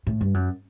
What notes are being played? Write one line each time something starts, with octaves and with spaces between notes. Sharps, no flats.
A2
G2
F#2